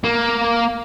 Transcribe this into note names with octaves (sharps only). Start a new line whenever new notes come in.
A#3